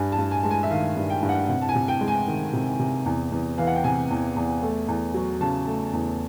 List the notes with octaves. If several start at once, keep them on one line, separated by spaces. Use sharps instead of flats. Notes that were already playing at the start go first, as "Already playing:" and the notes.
Already playing: G2 G#5
A5
G2
G#5
G#3 A5
G#5
E5
D#3 F5
G2
G5
G2
F#5
C3 F#5
A5
G#5
C3
G5
G#3
G#5
D#3
C3
C3
E2
E2
E3 F5
F#5
G5
C3 G#5
E2
E2
A3
E2
F#3
C#3 A5
A3
E2